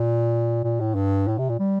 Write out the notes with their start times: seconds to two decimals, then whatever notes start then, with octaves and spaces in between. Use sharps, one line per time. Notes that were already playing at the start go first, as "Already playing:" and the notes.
Already playing: A#2
0.64 A#2
0.80 A2
0.95 G2
1.28 A2
1.38 C3
1.49 A#2
1.59 G3